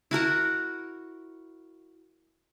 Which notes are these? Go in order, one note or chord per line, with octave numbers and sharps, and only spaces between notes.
E4 F#4 A#4 F#5